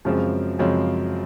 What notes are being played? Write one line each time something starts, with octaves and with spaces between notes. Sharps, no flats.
F#2 C#3 F3 G#3 C4
F#2 C#3 F3 G#3 C4